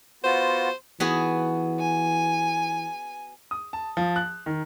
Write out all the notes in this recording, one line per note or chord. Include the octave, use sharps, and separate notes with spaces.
B3 F4 F#4 C5
E3 B3 F#4 G#4
G#5
D#6
A5
F3
F#6
D#3